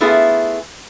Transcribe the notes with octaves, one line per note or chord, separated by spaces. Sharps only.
A3 B3 E4 F4 G#4